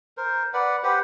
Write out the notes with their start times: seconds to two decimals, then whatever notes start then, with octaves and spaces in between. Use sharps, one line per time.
0.17 A#4 C5
0.53 B4 D5 F#5
0.83 G4 B4 C5 F#5